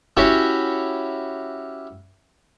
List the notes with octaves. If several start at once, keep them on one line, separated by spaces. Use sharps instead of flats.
C#4 E4 F#4 G4 C#5